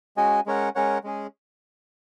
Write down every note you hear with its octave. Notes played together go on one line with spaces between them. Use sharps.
G#3 C#4 F#4 D#5 G#5
G#3 C#4 A#4 C#5 F#5
G#3 C#4 A#4 C#5 F#5
G#3 C#4 G#4